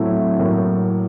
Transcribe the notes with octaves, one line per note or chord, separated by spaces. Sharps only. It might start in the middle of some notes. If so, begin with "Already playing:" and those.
Already playing: A2 F#3 A3 C4 E4
A2 F#3 A#3